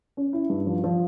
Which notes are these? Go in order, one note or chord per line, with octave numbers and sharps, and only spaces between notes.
C#4
E4
G2
F3
F3